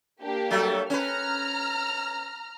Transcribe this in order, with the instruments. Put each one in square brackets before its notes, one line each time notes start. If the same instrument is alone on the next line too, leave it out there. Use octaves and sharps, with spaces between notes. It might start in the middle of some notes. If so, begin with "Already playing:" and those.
[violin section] A#3 D4 G4
[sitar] F#3 G3 A3
[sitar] C#4 B4 [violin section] A#5 F6